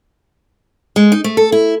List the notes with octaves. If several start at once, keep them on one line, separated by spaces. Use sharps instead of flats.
G#3
D#4
A3
A4
E4